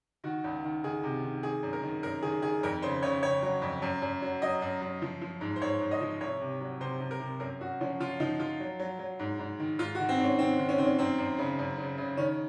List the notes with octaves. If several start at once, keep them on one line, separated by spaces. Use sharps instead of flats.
D#3 F#4
C#2
D#3
D#3 G#4
C3
D#3
D#3 G#4
F#2
A#4
D#3
F#2 A#4
D#3 G#4
D#3 G#4
F2 A#4
C#3 C5
C#3 C#5
C#3 C#5
F#3
F2
F#2
F#2
F#3
F#3 D#5
F#2
F#2
F3
F3
G#2
C5
G#2 C#5
G#2
D#5
F3
C2 C#5
C3
F#3
C3 C5
C3
A#4
C3
F#2 A#4
F#2 F#4
F3 C#4
F3 F4
F3 D#4
F3 F4
F#3
F#3
F#3
G#2
G#2
D#3
G#2 F4
F#4
D#3
C4
G#2
C#4
D#3 C4
D#3
C#4
D#3 C4
C#4
F#2 C4
F#2
C#3
F#2
C#3
C#3
D#3 C#4